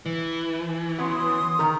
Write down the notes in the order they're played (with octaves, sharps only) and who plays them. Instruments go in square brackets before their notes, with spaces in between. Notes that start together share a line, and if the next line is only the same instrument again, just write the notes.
[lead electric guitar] E3
[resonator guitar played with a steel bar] F#3 B3 C#4 [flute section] C6 D#6
[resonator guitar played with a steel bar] D#3 A#4